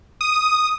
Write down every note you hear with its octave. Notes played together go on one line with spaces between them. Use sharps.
D#6